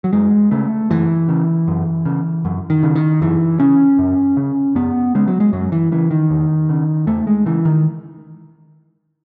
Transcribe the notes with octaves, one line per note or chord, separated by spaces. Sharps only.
F#3
F#2 G#3
C#3 A3
F#2 E3
C#3
F#2
C#3
F#2
D#3
C#3
D#3
F#2 E3
C#3 C#4
F#2
C#3
F#2 B3
C#3 G#3
F#3
G#3
F#2 F#3
E3
C#3 E3
D#3
E2
C#3
E2 A3
G#3
C#3 E3
D#3